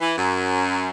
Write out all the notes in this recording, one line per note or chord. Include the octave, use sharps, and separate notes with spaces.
E3
F#2